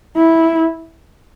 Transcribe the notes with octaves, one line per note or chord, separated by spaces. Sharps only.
E4